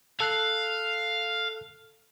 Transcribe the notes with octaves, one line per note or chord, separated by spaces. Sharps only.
A4 F5 F#6 C7